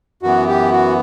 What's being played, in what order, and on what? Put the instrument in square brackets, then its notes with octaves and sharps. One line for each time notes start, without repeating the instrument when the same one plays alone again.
[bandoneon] F#2 E3 B3 [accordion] F#4
[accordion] G4
F#4